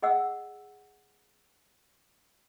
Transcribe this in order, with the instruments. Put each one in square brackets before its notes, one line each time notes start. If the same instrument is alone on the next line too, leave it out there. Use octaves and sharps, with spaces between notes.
[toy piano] G#4 D#5 F#5 E6